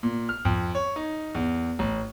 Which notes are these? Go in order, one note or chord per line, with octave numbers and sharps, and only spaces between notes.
A#2
F6
F2
C#5
D#4
E2
A1